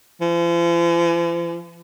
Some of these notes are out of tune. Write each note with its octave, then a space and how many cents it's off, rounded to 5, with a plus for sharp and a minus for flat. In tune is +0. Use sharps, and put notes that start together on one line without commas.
F3 -45